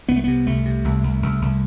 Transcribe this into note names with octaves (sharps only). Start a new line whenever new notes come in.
C2 B3
A3
C3 B3
C2 A3
C3
C2
C2
C2
C2